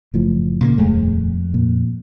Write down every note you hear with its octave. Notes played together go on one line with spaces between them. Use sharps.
F#1 A2 F3
A#2 C#3 A3 A#3
D#1 F2 G#3 A3
A#2